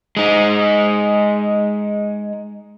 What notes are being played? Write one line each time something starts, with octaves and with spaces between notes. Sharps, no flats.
G#3 D#4